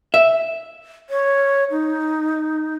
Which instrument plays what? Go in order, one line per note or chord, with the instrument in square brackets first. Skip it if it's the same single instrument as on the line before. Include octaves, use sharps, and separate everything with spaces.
[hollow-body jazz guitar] E5
[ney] C#5
D#4